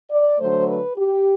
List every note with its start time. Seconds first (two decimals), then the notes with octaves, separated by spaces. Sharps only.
0.10 D5
0.39 D3 F#3 A3 C5
0.68 B4
0.96 G4